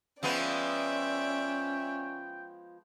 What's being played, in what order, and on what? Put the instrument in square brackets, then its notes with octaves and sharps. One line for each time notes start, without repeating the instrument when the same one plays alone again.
[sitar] F3 G#3 B3 [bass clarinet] C#4 [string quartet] D5 E5 [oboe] G5